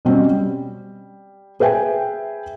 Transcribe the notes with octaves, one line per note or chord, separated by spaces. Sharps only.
B2 G3 C4 C#4
G3
G#4 B4 E5 G5 G#5